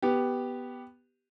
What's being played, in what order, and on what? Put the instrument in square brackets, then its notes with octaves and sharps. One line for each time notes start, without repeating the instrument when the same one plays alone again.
[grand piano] B3 G4